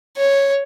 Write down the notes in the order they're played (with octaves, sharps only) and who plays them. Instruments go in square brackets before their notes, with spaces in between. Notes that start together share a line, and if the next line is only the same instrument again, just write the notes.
[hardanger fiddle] C#5